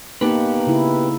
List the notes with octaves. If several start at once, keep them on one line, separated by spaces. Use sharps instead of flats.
A#3 B3 D#4 G4 B4
C#3 E4